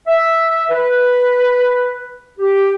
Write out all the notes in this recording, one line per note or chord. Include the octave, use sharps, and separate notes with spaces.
E5
B4
G4